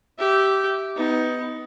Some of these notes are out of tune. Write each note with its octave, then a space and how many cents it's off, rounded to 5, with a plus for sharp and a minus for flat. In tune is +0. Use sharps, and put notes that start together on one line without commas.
G4 -15 E5 +0
B3 +20 D#4 +15